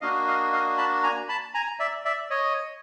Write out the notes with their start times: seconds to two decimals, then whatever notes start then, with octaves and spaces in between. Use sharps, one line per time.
0.01 A#3 D4 F#4 D#5 F5
0.27 D#5 F5
0.52 D#5 F5
0.77 A5 B5
1.03 G#5 A#5
1.29 A5 B5
1.54 G#5 A#5
1.79 D5 E5
2.05 D5 E5
2.30 C#5 D#5